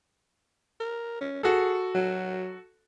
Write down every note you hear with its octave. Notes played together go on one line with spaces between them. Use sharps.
A#4
C#4
F#4 G#4 A4
F#3